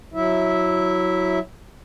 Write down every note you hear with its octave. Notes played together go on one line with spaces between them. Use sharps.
F#3 E4 E5